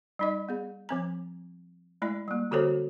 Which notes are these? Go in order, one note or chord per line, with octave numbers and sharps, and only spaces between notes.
G3 D#4 D#5
B3 G#4
F3 C4 A#5
G#3 A3 E4 D5
G3 A#3
D3 F#4 G4 A4 C5 C#5